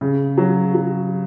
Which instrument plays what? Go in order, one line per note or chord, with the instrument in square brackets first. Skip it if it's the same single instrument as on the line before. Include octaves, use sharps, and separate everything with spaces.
[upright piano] C#3
F#3
F#3